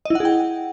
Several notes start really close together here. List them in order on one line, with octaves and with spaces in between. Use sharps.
D#5 E4 F#5 G#4 G5